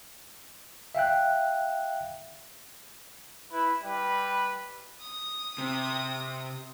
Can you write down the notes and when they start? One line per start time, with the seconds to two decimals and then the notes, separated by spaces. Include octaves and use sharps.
0.95 E5 F5 G5 F#6
3.52 E4 B4
3.83 G3 B4
5.00 D#6
5.58 C3